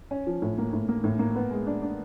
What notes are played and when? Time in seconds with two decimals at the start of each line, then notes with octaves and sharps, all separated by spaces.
0.11 C#4
0.27 F3
0.42 A2
0.58 A#3
0.73 A2
0.89 A#3
1.04 A2
1.19 A#3
1.36 B3
1.51 G#3
1.67 D4
1.82 D4